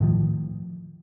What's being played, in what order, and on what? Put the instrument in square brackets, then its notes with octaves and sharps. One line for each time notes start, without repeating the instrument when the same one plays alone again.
[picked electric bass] A2 D#3 F3